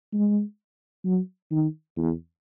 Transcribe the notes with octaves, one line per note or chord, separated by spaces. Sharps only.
G#3
F#3
D#3
E2